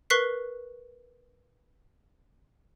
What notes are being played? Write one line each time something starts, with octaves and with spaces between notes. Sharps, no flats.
A#4 B4 C#6 F#6 B6 C7